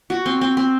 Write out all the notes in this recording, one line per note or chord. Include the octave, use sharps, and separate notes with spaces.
F#4
C4
C4
C4